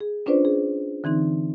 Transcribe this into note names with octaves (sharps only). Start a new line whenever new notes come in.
G#4
C#4 D4 F4 B4 C5 D5
G#4
D3 E3 C4 D#4